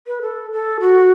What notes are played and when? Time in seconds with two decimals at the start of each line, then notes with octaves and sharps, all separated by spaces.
0.06 B4
0.21 A4
0.52 A4
0.80 F#4